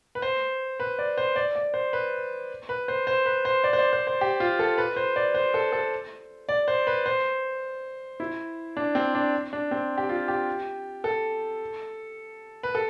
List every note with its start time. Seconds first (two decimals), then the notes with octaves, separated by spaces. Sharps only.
0.15 B4
0.22 C5
0.80 B4
0.99 D5
1.18 C5
1.36 D5
1.56 D5
1.74 C5
1.93 B4
2.69 B4
2.88 C5
3.07 C5
3.26 B4
3.45 C5
3.64 D5
3.73 C5
3.79 D5
3.93 C5
4.07 C5
4.21 G4
4.40 F4
4.59 A4
4.78 B4
4.96 C5
5.16 D5
5.35 C5
5.54 A4
5.73 A4
6.49 D5
6.68 C5
6.87 B4
7.06 C5
8.20 E4
8.77 D4
8.95 C4
9.15 D4
9.53 D4
9.71 C4
9.98 G4
10.09 F4
10.28 G4
11.04 A4
12.63 B4
12.75 A4